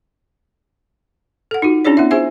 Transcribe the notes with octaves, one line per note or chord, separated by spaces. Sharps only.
A4 F#5
D#4 F4 F#4
C#4 D4 E4 G#4 C#5 D5
B3 E4 E5
F4 G#4 C5 E5 G#5